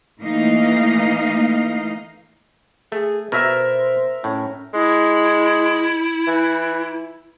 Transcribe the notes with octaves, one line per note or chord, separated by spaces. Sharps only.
E3 A3 A#3 D#4 F5
A3 G#4
B2 A#4 C5 E5
A2 C#4
G#3 E4
E3